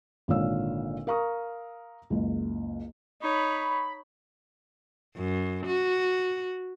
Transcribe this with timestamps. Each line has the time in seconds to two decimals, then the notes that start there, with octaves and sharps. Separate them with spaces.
0.28 G#1 A#2 D3 C#5 F5 E6
1.07 A#4 F5 A#5 C#6 D#6
2.10 F#1 C#2
3.21 D#4 C#5 B5
5.17 F#2
5.67 F#4